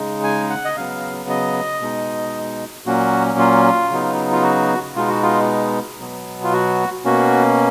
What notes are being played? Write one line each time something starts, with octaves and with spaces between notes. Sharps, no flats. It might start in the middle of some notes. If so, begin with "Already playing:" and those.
Already playing: C#3 G#3 D#4
G#5
F#5
D#5
C#3 F#3 B3 F5
D#5
B2 G#3 D#4
A#2 F#3 A#3 C#4 F#4
F4
C#3 F#3 B3 D#4
F4
F#4
B2 G#3 B3 D#4 F4
F#4
F4
B2 F#3 B3
F4
F#4
B2 A#3 C#4 F#4